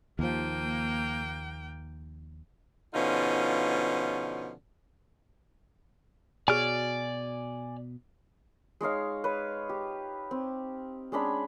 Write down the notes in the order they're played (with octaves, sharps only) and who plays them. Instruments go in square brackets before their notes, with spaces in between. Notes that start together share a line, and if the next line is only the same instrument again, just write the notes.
[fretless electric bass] D#2 F3 [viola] A#3 G5
[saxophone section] B2 D3 F3 C#4 D#4 F4
[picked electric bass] B2 [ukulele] F#4 G#4 C#5 [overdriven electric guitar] D5 [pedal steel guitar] G#5 F6
[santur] G#3 D#4 C#5 F5
B4 C#5
G4
C4
G#3 C#4 D4 B5